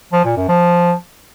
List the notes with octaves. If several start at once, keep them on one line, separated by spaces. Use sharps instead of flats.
F3
A#2
F#2
F3